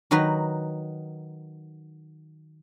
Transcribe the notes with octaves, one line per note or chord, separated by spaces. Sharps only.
D#3 F#3 D#4 F#4 B4